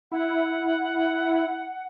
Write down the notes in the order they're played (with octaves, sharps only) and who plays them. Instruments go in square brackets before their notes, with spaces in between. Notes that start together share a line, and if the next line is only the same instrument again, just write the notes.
[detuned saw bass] E4 [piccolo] F#5